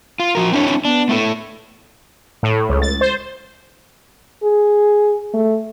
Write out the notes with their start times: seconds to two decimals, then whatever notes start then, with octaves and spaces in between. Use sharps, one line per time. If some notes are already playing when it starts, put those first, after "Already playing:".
0.20 F4
0.35 F3 F#4 A#4
0.53 C4 D4 E4 C#5
0.68 D4
0.85 B3 D4
1.09 A3 E4 A4
2.43 A2
2.69 C#2
2.82 A6
3.01 C5
4.43 G#4
5.34 A3